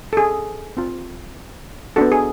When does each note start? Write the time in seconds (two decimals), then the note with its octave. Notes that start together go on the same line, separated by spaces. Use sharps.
0.13 A4
0.17 G#4
0.77 C4 F4
1.96 B3 D4 F#4 A4
2.12 G#4